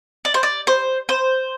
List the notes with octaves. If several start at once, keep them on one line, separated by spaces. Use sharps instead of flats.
D5
C5
D5
C5
C5